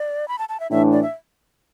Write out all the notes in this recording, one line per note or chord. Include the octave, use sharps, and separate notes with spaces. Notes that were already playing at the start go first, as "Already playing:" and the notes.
Already playing: D5
B5
A5
A5
E5
A2 E3 D4 E5
D5
E5